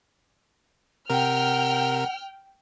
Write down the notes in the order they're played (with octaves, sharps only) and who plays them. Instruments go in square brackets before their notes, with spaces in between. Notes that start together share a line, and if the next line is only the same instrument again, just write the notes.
[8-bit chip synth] C3 A#4 [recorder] F#5 [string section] G5 F6